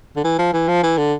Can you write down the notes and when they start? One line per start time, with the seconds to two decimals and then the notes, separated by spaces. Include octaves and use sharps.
0.16 D3
0.24 E3
0.39 F3
0.53 E3
0.68 F3
0.83 E3
0.98 D3